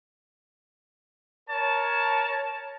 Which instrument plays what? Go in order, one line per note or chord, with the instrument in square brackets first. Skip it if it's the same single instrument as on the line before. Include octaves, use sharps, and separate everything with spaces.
[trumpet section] A#4 C#5 A5